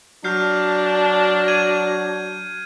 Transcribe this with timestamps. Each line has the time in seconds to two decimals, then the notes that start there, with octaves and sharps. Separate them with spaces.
0.24 F#3 D4 F6 G6 C7
1.48 G#6 D#7